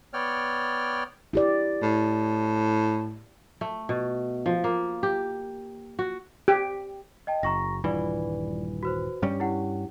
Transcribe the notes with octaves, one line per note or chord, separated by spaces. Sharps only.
B3 C#5 D5 G5 F6
E4 G4 D5
A2
A3
B2
F3
A#3
G4
F#4
G4
D#5 G5 A5
F#1 A#5 C#6 A#6
D#1 G2 E3 F4 B4 D5
F#4 B4 C5
G2 G3 C#4
E4 G4 F#5